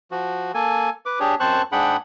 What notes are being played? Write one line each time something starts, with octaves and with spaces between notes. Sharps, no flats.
F3 F#4
A#3 A4 G#5
B4 D6
D4 G4 G#4 C#5
F#2 C4 C5 A5 C#6 F#6
G#2 D4 G#4 F#5 G5 B5